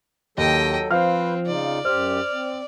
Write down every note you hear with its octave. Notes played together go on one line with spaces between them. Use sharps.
D#2 F#3 A4 D#5 G5
F3 C4 B4 C5 F5 F6
C#3 D#4 F4 D5
F#2 G4 C5 F6
C4